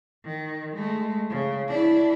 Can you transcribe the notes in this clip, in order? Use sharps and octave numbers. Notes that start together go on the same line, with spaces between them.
D#3
G#3 A3
C#3
D4 E4